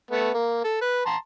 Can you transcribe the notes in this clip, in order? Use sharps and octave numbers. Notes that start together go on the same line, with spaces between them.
A3 B3
A#3
A4
B4
A5 A#5 C6